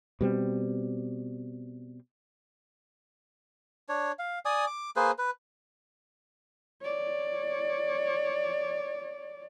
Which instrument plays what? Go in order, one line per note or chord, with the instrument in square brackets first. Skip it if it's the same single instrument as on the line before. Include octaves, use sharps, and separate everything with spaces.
[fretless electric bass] B2 G3 C4
[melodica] D4 C#5
F5
D5 G#5 D#6
D6
A#3 G#4 B4 C5
B4
[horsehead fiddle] C#5 D5